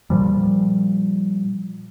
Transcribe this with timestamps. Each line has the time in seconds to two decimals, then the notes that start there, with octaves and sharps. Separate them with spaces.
0.10 A#2 F3 G3